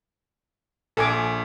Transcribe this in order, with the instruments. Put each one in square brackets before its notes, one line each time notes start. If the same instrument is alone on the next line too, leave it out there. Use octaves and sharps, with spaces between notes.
[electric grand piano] A#1 [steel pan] A4 G#5 D6